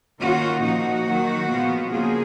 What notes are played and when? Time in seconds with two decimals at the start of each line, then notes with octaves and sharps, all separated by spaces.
0.20 D#3 A#3 C#4 F4 F#4
0.63 A#2 F3 A#3 D#4 F#4
1.07 D#3 F#3 A#3
1.49 A#2 F3 G#3 B3 F4
1.93 C#3 F3 A#3 F4 G#4